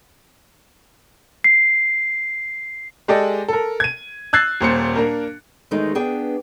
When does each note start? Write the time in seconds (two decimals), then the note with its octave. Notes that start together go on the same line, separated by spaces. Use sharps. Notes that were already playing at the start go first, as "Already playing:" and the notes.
1.44 C7
3.08 G#3 G4 A4 D5 D#5
3.48 A4 A#4
3.80 G#6 D#7
4.33 E6 F#6 G#6 A6 C7
4.61 D#1 A#2 C5 C#7
4.96 A#3 D4 A#4
5.71 E2 D#3 G#3 A3 D#4 G#4
5.95 B3 D4 G#4 G5